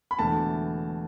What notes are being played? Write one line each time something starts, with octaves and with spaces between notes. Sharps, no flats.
B5
E1 E2 D3 A3 A5